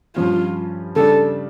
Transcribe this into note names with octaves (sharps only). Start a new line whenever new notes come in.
G2 F3 C#4 F4
C#3 G3 D4 A4